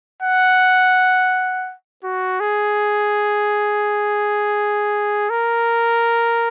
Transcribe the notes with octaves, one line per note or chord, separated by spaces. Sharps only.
F#5
F#4
G#4
A#4